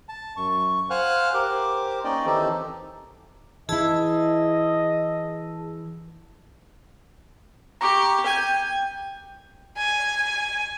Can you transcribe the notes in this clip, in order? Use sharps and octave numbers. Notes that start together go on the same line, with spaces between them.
A5
F#2 C#6
C5 F5 F#5 G#5 F6 F#6
G4 A#4 C5 D6
A#3 C#4 D#4 D5 D#5 G5
D#3 E3 C4 D#4 G4 A4
E3 E4 G#4 D#5 A5 E6
G4 A#5 C#6 D6
G5 G#5 G6
G#5